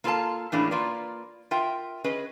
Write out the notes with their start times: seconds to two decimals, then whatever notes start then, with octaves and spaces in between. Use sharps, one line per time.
0.04 A#3 F4 A4 A#4 F5 A5
0.52 A2 E3 A#3 C#4 D4 G#4
0.71 A#3 F4 B4 D5
1.51 F4 A#4 E5 G5
2.04 C#4 G#4 B4 D#5